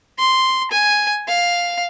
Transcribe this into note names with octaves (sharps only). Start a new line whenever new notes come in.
C6
G#5
F5